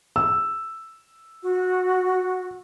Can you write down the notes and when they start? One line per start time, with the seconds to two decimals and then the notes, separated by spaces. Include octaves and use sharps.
0.16 E6
1.43 F#4